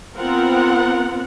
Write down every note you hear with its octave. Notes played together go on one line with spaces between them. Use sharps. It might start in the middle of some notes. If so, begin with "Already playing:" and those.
B3 C4 F4 A#4 F#5